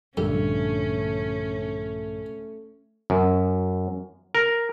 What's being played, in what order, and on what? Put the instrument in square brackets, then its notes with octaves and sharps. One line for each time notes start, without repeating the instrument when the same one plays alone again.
[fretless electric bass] A#1 G2 D3 [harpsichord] A#2 G3 A4 [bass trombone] A3 [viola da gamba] C#4
[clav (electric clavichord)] F#2
A#4